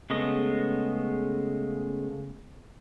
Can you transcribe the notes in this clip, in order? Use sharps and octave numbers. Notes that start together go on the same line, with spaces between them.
C#3 G#3 A3 B3 D#5